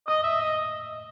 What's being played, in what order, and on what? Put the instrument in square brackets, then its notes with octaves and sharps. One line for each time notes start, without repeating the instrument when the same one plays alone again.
[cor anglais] D#5 [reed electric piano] D#6
[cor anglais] E5
D#5